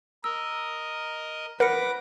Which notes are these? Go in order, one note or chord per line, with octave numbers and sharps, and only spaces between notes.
A#4 D#5 E6
A#4 B4 F#5 D6 A#6 C#7